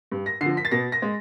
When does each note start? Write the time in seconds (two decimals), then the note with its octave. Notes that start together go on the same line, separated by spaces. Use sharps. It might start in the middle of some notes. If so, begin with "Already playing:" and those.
0.12 G2
0.26 A#6
0.41 D3 C7
0.46 F3
0.57 B6
0.65 A6
0.71 B2 A#6
0.92 A#6
1.02 G#3